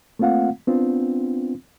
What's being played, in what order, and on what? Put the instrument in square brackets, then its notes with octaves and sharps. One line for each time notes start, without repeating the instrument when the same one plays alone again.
[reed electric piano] A3 A#3 C4 F4 F5 F#5
B3 C4 D4 F4